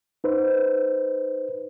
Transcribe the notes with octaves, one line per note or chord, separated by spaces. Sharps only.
D#4 B4 C5